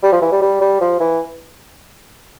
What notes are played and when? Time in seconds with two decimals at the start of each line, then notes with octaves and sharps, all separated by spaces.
0.03 G3
0.12 F3
0.22 E3
0.32 G3
0.42 G3
0.61 G3
0.81 F3
1.00 E3